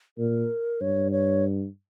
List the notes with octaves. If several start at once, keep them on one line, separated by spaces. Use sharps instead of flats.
A#2 A#4
G2 C#5
C#5